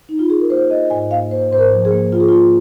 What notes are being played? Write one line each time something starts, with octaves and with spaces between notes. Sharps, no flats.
D#4
F4
G#4
A#4
A#3 C5
A#3 D#5
G#2 G#5
A#3 F5
A#3 C5
G#2 C5
A#4
F3
G#4
A#3
A#3 F4
G#4
A#3 F4